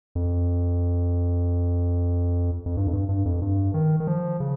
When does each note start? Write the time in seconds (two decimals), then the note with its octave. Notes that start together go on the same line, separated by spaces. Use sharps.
0.15 F2
2.66 F2
2.77 G2
2.87 F2
2.93 G2
3.09 G2
3.25 F2
3.42 G2
3.74 D#3
4.00 D#3
4.07 F3
4.40 C#3